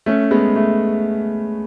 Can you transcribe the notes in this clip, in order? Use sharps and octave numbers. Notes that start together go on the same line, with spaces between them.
A3 C#4
G#3 B3
A3